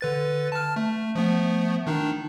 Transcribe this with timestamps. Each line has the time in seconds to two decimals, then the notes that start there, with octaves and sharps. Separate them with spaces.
0.01 D3 B4 A6
0.52 A5 F6
0.76 A3
1.15 F3 A3 B3
1.87 D#3 D4 D#4